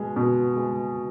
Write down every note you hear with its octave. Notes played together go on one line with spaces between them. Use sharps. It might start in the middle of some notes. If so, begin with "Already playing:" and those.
Already playing: B2 G#3
B2
G#3